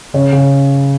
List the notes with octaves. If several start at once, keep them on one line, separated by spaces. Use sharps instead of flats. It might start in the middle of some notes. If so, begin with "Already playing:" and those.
C#3 C#5
C#3